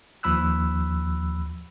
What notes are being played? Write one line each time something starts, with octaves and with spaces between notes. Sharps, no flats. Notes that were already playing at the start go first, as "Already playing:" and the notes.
D#2 F3 B5 E6 F#6